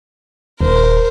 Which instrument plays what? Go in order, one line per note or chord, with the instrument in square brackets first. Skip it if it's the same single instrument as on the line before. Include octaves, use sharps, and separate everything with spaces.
[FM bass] D#1 [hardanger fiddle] A#4 C5